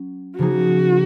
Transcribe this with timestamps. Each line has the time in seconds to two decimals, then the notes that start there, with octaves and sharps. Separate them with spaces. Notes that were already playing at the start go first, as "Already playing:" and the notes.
Already playing: F#3 C#4
0.38 C#3 F3 A#3 D#4 F#4 G#4